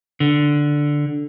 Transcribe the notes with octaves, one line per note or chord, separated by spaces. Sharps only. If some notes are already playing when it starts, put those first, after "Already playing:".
D3